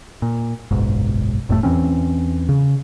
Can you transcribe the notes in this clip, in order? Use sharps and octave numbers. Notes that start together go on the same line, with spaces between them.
A#2
F#1 B1 G#2
F#1 F2 A2 A3
E2 E3 C4 C#4
C#3